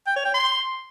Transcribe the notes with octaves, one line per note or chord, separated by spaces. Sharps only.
G5
C#5
G5
C6